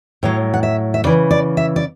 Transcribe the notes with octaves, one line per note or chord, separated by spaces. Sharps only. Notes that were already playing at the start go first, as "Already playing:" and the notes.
A2 F#3 C#5
F#5
E5
E5
C#3 E3 D5
D5
E5
D5